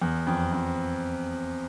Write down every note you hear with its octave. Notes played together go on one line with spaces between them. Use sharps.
E2
F2
F2